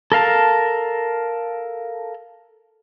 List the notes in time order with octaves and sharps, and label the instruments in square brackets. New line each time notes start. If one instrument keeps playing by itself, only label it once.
[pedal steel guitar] A4 A#4 F5 A5